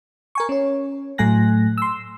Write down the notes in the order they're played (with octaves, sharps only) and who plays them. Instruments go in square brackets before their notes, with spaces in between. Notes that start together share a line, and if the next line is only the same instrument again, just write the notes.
[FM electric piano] A#4 G#5 C#6
C#4 C#5
A2 F#3 A3 G#5 F#6 A#6
C6 E6